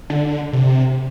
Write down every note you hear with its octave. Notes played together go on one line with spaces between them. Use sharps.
D3
C3